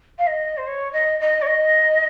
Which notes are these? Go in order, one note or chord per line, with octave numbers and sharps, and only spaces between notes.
F5
D#5
C5
C#5
D#5
D#5
C#5
D#5